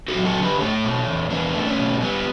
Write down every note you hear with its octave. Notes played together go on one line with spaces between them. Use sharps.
F#4 A4
F#3
F#4 A4
D3
G4 B4
A3 A4 C#5
B2
E2
E2 B3 D4
A3
A3 C#4
B2
G3 B3